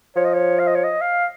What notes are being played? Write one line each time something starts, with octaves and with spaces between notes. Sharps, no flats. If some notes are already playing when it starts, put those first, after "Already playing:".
F3 C#5
D#5
C#5
F5
D#5
C#5
D#5
F5